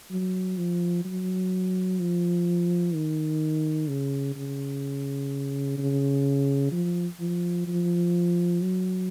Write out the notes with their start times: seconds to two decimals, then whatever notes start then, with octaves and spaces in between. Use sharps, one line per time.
0.11 F#3
0.57 F3
1.05 F#3
2.00 F3
2.94 D#3
3.89 C#3
4.36 C#3
5.78 C#3
6.72 F3
7.20 F3
7.67 F3
8.62 F#3